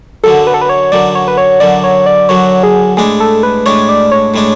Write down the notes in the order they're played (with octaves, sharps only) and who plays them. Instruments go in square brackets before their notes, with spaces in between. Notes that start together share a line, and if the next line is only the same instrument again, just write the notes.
[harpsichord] F#2 D3 F#3 [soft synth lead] A4
[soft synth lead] B4
A4
B4
C#5
[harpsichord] F#2 D3 F#3 [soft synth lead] D5
[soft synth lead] C#5
B4
C#5
[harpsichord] F#2 D3 F#3 [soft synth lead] D5
[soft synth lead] C#5
D5
[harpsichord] F#2 D3 F#3 [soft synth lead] C#5
[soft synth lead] G#4
[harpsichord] A2 G#3 D4 [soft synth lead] G#4
[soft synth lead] A4
B4
[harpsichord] A2 G#3 D4 [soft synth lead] C#5
[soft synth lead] D5
C#5
[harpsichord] A2 G#3 D4